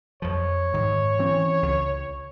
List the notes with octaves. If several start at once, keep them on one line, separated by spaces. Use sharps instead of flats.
F2 F3 C#5
G#2 D#3
E3 C4 C#4
C#2